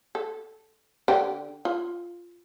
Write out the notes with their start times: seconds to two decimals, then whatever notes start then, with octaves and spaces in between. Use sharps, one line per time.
0.15 A4
1.08 D3 G4 G5
1.65 F4